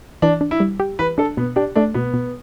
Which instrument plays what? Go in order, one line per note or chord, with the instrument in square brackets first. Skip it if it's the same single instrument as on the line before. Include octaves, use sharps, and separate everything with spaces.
[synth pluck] E3 [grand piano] D4
[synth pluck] D4
[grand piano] E4
[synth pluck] G3
G4
[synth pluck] E3 [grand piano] B4
[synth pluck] D4 [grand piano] A4
[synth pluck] B2 [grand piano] B3
[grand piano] D4 [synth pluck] G4
[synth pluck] A3 [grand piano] D4
[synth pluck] B2 [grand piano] B3
[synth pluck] B2